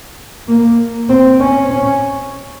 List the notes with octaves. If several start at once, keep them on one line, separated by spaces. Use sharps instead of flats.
A#3
C4
C#4
C#4